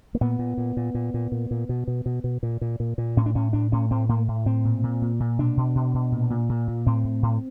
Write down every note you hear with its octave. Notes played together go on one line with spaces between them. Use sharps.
A#3
A#2 B3
A#2
A#2
A#2
A#2
A#2
A#2
A#2
B2
B2
B2
B2
A#2
A#2
A#2
A#2
A2 C#4
D4
A2 C#4
A2 D4
A2 C#4
A2 C4
A2 A#3
A2
A2 C4
A#2
A#2
A#2
A#2
B2 D4
B2
B2
B2
A#2
A#2
A#2
A#2
A2 C4
A2
A2